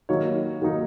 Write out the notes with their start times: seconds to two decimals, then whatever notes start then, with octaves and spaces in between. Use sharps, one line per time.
0.09 D#3 F#3 A#3 D#4 C#5
0.62 D#3 F#3 A#3 D#4